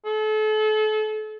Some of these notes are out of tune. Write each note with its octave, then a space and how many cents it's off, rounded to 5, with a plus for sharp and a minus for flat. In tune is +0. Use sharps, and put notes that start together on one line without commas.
A4 -35